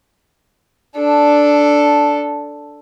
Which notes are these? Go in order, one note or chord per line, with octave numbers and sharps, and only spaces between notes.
D4 A4